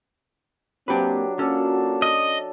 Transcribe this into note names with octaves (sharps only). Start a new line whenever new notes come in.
F#3 A#3 C4 D4 G4 B4
A#3 C#4 F4 F#4 A4 D5
D#5